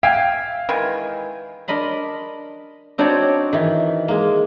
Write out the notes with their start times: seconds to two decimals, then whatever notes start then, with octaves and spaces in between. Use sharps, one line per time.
0.03 E5 F5 G5 G#5
0.69 D#3 E3 G#3
1.68 D4 A#4 D#5 B5 C6
2.98 C4 D4 D#4 F#4 C#5 D5
3.53 D#3 E3
4.08 G#3 A#3